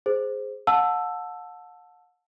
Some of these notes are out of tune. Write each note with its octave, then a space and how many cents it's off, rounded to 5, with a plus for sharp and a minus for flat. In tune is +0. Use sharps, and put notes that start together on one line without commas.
G#4 +0 C5 +0
F#5 -40 A5 +0 E6 +5